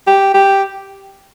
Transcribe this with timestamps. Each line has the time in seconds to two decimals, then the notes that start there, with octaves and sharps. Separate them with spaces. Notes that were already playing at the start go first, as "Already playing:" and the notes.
0.07 G4
0.34 G4